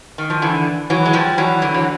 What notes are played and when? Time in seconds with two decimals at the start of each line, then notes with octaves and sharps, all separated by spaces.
0.18 D#3
0.30 F3
0.42 D3 E3
0.90 E3 F#3
1.06 G#3
1.13 F3 G3
1.38 E3 F#3
1.62 D3 E3
1.74 F#3